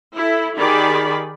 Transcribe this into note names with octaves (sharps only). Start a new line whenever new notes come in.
E4 A4
D#3 G4 G#4 D5 B5